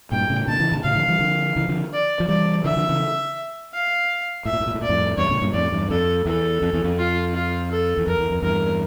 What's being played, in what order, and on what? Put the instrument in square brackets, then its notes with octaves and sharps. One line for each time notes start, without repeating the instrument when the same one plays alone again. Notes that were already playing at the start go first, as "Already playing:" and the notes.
[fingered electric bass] G2 A#2 [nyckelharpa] G5
[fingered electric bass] A2 C#3
[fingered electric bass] A#2 D3 [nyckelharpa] A5
[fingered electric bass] C#3 E3
A#2 D3
[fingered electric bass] A2 C#3 [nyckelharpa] F5
[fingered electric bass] D3 F3
E3 G3
D3 F3
C#3 E3
D3 F3
[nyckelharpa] D5
[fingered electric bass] F3
[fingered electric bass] E3 G3 [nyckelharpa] D5
[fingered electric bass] D3 F3 [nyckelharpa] E5
[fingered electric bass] E3
D3 F3
C#3 E3
[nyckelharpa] F5
[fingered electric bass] A2 [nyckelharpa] E5
[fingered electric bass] A#2
A2
A#2
A2
[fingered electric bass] A#2 [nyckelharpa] D5
[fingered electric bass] F2 A2
[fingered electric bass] E2 G2 [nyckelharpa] C#5
[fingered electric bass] A2 C#3
G2 A#2
[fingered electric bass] F2 A2 [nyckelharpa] D5
[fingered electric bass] E2 G2
[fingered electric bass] F2 [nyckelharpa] A4
[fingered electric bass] E2 [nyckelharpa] A4
[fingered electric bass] F2
E2
F2
[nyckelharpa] F4
F4
A4
[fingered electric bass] E2
[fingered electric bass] F2 [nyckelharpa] A#4
[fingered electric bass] E2
F2
[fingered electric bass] E2 G2 [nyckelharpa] A#4